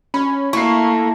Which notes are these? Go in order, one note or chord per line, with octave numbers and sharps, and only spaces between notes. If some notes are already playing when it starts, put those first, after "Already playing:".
C#4 B5
A3 A#3 E4 C#6 C7